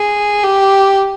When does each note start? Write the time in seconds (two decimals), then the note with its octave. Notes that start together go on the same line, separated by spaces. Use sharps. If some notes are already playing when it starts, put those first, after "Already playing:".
Already playing: G#4
0.44 G4